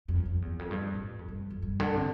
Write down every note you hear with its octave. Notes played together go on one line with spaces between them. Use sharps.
F2
F2
E2
F2
G2
A2
F2
G2
F2
G2
D3
C3